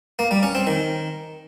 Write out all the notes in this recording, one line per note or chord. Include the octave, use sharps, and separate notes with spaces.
A#3
G3
C#4
C4
D#3